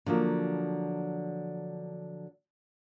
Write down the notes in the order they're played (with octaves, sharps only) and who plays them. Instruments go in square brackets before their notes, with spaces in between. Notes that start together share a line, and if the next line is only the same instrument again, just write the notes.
[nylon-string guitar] D3 F3 F#3 A#3